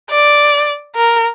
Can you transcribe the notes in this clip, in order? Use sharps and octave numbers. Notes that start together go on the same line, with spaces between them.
D5
A#4